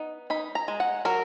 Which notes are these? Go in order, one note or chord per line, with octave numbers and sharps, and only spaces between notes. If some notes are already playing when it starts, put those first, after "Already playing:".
Already playing: B3 D#4
D#4 B5
A#5
G#3
F#5
F#3 A#4